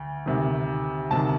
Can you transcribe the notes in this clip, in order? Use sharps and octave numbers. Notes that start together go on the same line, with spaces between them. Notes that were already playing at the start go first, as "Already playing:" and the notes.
Already playing: D2
D2 C3 D#3
D2 C3 D#3 A5